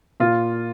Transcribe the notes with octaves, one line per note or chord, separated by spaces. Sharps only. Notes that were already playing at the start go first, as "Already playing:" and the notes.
A#2 F4